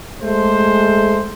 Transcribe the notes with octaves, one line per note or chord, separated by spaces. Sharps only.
G#3 A3 C5